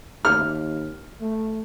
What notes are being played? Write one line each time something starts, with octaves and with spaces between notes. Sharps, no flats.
D#2 F6
A3